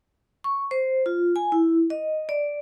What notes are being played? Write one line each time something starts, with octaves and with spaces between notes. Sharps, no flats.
C#6
C5
F4
G#5
E4
D#5
D5